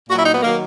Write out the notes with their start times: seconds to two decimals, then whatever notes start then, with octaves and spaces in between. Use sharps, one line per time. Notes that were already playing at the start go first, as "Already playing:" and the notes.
0.10 A#2 F#4
0.14 F#3 E4
0.26 D#4
0.34 B3
0.42 D#3 F#3 A#3